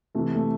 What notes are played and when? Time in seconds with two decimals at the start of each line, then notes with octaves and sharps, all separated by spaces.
0.15 C3 E3 A3
0.35 A3